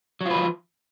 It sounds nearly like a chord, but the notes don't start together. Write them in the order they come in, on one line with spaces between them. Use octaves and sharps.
F#3 F4 B4 F3